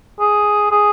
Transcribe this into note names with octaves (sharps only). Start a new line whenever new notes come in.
G#4
G#4